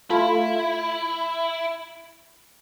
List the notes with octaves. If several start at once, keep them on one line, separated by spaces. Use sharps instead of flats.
A3 E4 F4 B5